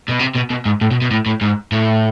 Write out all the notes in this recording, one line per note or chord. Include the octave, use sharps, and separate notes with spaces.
B2
C3
B2
B2
G#2
A2
B2
B2
A2
A2
G#2
A2